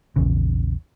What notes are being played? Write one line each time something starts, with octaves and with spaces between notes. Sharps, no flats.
A#1 E2 C#3